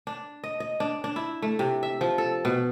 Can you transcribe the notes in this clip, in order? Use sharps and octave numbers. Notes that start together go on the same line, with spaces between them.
D4
D#5
D#5
D4
D4
E4
A3
C3
E5
F3
A4
B2